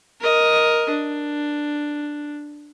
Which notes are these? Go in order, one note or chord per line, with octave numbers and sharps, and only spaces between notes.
A#4 D#5
D4